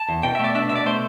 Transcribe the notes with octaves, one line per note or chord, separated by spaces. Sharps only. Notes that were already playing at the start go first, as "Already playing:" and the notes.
Already playing: A5
E2
B2 G5
E5
A3
D5
D4 E5
B2 E5
D5
A3 C5